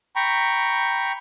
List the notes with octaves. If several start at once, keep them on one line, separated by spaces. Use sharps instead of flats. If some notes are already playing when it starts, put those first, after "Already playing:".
G5 A#5 B5 C#6